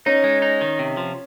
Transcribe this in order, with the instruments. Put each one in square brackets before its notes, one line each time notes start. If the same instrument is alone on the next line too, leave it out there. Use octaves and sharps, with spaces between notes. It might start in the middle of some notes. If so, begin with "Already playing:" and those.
[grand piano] C#4 [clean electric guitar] D#4
[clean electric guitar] G#3
D#4
D#3
C3
F3